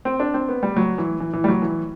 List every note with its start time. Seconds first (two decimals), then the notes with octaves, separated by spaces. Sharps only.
0.05 C4
0.20 D4
0.34 C4
0.49 B3
0.63 G3
0.77 F#3
0.98 E3
1.20 E3
1.33 E3
1.44 G3
1.48 F#3
1.62 E3